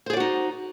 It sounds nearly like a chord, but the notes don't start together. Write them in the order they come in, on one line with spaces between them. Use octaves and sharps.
C5 G#4 D5 F#4 D#4